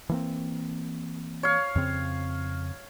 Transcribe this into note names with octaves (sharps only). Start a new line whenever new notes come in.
E3 A#3 C4
C#5 F5
F2 C#3 C4